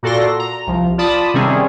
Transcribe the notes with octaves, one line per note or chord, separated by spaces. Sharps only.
A#2 F#4 A4 D5 C6 A#6
A#5
C2 F3
F4 D5 A5 B5 D#6
C3 D#3 G3 C4 C#4 G#4